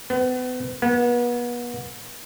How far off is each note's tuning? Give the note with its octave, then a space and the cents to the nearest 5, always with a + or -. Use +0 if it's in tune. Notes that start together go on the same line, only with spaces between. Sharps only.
B3 +35
B3 -35